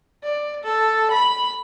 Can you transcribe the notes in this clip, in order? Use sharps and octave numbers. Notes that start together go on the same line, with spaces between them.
D5
A4
B5